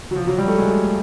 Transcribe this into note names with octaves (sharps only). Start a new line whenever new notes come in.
F#3
F3
F#3
G3
A3
G#3